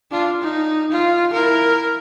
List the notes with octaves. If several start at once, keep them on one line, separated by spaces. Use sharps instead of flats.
D4 F4
D#4
F4
E4 A#4